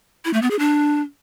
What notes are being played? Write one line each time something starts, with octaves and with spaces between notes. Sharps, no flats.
E4
A3
B3
G#4
D4